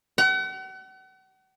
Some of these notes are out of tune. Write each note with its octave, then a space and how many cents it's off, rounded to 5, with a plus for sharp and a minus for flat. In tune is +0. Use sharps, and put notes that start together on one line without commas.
F#5 +40